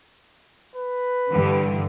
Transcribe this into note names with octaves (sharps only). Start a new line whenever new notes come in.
B4
G2 D3 E3